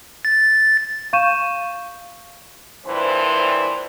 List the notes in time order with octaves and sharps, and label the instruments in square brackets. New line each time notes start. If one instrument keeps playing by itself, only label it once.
[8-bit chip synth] A6
[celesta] F5 C#6 G6 D#7 E7
[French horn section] G2 A#2 E3 [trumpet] C5